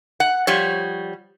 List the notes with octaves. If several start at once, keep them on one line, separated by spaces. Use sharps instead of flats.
F#5
F3 G3 C#5